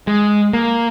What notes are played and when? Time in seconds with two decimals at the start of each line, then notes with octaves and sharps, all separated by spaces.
0.07 G#3
0.53 A#3